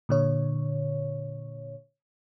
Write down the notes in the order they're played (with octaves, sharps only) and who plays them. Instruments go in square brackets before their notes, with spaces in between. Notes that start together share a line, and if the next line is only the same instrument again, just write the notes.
[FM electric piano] A#2 D3 C#5